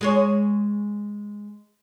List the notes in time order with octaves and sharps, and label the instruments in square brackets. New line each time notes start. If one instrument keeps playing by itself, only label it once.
[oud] G#3 G#4 C#5